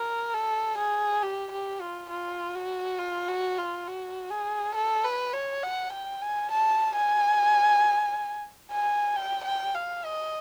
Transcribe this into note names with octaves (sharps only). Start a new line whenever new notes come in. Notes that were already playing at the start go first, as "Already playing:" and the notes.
Already playing: A#4
A4
G#4
G4
G4
F4
F4
F#4
F4
F#4
F4
F#4
G#4
A4
B4
C#5
F#5
G5
G#5
A5
G#5
G#5
G5
G5
F5
D#5